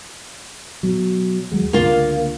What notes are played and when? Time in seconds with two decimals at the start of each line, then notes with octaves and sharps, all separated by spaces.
0.83 B2 F#3
1.51 D#2 F#3 G#3
1.73 C#2 D3 A#3 F4